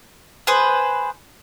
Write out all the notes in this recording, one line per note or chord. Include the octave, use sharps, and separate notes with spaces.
G#4 B4 C5